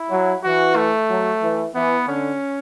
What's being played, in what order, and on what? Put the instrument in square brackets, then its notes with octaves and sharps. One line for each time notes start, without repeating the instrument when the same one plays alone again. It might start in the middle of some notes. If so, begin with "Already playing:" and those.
Already playing: [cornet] E4
[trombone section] F#3
[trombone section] E3 [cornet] F#4
[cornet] A3
[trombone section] F#3
E3
[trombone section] E3 [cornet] B3
[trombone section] D3 [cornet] C#4